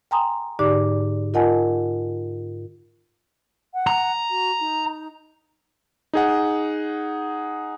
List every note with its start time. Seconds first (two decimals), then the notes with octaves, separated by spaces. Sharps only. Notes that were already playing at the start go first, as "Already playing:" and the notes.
0.11 G5 G#5 A#5 C6 D#6
0.59 G#2 D3 D#4 G4 D5 D6
1.34 F4 A#4 D#5 F#5 G#5 A5
3.74 F#5
3.87 A#5
4.30 F#4
4.60 D#4
6.13 D#4 G#4 F#5